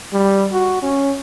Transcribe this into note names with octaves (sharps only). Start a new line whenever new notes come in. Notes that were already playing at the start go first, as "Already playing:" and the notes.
G3
F#4
C#4